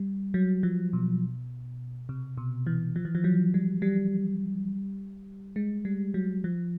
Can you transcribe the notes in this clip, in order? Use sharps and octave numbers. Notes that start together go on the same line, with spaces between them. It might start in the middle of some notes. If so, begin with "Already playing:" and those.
Already playing: G3
F#3
F3
B2
C3
B2
E3
F3
E3
F3
F#3
G3
G3
G#3
G3
F#3
F3